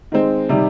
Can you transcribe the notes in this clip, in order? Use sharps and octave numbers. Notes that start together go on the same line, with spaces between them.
D#3 G#3 C4
C3 D#3 G3